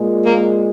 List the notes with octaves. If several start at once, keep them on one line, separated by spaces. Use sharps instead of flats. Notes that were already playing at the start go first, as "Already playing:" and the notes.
Already playing: A#2 G#3
A#3